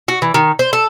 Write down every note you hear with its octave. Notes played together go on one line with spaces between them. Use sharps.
F#4
E3
D#3
C5
A4